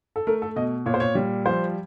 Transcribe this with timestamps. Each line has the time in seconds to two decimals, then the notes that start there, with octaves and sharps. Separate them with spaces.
0.16 A4
0.27 A3 A#4
0.42 A4
0.56 B2 D#5
0.86 A#2 C#5
0.94 C5
1.00 C#5
1.15 G3
1.45 F3 C5